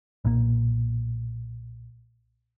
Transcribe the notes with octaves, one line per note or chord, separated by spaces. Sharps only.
B1 A#2 A#3